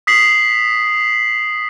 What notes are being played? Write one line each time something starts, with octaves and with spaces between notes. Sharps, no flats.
D#6 B6 C7 F#7